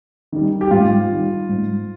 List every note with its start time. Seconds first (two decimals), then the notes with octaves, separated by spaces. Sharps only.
0.32 D#3 G3
0.61 G4
0.71 G#2 F4
1.10 D#3 G3
1.49 G#2